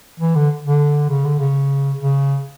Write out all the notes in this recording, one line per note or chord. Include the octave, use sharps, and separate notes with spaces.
E3
D3
D3
C#3
D3
C#3
C#3